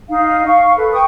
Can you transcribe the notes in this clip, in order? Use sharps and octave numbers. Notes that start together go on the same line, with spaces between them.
D#4 F5
F5 C#6
A4 B4
G5 C#6 D#6